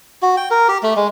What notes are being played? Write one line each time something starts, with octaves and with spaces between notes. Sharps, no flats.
F#4
G5
A#4
G4
A3
G#3